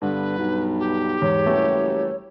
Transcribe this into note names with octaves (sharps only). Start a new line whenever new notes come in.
G2 D3 B3 B4
B1
G4
E2 G#2 C#5
F#1 E3 G3 A3